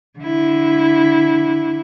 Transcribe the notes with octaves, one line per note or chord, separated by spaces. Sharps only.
D3 E4